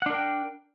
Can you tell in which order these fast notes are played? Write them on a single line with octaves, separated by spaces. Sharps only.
F#5 D4 A#4 G5